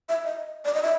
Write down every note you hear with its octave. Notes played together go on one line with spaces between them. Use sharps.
E5
D#5
D5
D#5
E5